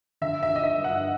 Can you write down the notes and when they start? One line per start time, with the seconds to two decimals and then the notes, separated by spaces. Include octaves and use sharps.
0.21 D3 E5
0.43 E5
0.50 D3
0.56 D#5
0.63 E5
0.78 G2
0.84 F#5